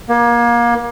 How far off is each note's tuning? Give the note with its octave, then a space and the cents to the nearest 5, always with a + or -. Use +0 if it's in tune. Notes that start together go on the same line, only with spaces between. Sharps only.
A#3 +30